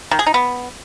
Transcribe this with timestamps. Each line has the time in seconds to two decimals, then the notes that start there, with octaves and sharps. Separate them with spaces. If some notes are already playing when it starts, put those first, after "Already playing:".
0.11 D#3
0.19 G#4
0.27 D#4
0.34 B3